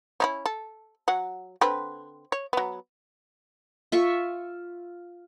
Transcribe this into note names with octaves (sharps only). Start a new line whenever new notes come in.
C#4 D#4 E4
A4
F#3 F#5
D3 C4 B4
C#5
F#3 B3
F4 E5 C#6